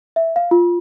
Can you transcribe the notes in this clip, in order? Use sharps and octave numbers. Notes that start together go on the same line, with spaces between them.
E5
F5
F4